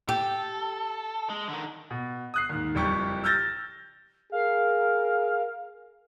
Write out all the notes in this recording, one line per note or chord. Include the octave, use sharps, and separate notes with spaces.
G4 A4
G#3
D3 D#3
B2
D#6 F#6 C7
D#2 G#2
F#1 F2 G3 G4 C#6
E6 F6 G6 A6 A#6
G#4 A#4 F5